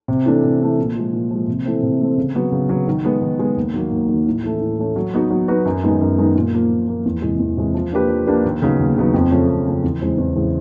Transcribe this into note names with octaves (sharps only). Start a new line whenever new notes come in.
C3
E3 A3 D4
C3
E3 A3 D4
A#2
F3 G#3
A#2
F3 G#3
C3
E3 A3 C4
C3
E3 A3 C4
C#3
F#3 B3
C#3
F#3 B3
D#3
G#3 B3
D#3
G#3 B3
D#2
D#3 F#3 A#3
D#2
D#3 F#3 A#3
A2
E3 A3 C#4
A2
E3 A3 C#4
F#3
B3 D#4 F#4 B4
F#3
B3 D#4 F#4 B4
F#2
D#3 G#3 B3 D#4
F#2
D#3 G#3 B3 D#4
A#2
F3 A#3
A#2
F3 A#3
E2
C3 E3 G#3
E2
C3 E3 G#3
F3
A#3 D4 G4 B4
F3
A#3 D4 G4 B4
D#2
C#3 F#3 B3 D#4
D#2
C#3 F#3 B3 D#4
F2
C#3 F3 A3 C#4
F2
C#3 F3 A3 C#4
E2
C#3 E3 G#3 C4
E2
C#3 E3 G#3 C4